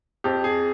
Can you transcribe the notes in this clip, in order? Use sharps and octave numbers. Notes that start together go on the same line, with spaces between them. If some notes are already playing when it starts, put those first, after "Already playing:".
F2 G4
G#4